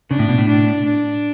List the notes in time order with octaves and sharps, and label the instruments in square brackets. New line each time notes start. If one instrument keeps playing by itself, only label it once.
[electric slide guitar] C#3 [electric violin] D4
[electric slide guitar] A2
B2
A2
[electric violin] D4
D4